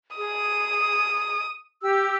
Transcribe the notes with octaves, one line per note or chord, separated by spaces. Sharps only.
G#4 D#6
G4 E6